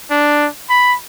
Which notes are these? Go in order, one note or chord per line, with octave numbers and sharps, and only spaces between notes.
D4
B5